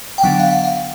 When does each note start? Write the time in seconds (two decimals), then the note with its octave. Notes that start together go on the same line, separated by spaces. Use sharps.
0.18 G5
0.23 D3 F#3 B3 D4 F#5
0.39 F5
0.50 F#5
0.64 F5